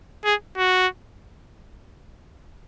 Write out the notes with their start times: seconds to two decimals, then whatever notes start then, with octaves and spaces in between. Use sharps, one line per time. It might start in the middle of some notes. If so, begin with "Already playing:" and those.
0.25 G#4
0.58 F#4